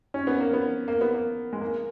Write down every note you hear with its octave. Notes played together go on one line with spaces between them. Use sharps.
C#4
B3
A#3
B3
A#3
B3
A#3
G#3
A#3